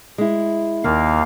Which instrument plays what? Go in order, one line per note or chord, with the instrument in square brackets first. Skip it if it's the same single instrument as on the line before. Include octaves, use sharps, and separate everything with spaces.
[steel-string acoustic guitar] G#3 E4
[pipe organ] D#2 A#3 F5 [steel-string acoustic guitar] D#3